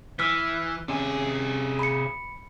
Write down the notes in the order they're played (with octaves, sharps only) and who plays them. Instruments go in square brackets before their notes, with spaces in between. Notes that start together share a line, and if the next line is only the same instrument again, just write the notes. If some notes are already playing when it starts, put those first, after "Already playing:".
[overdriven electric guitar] E3 [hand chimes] E6 F6 B6
[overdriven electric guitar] C3 G#4 [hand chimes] C#4
[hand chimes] B5 C#7